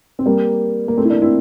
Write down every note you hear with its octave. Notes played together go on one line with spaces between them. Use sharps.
C4
G3 A#3
A#3
A3 C4
E4
A#3 D4
C4 E4